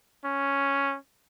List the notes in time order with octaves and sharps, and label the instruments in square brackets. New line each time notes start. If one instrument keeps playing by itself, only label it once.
[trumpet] C#4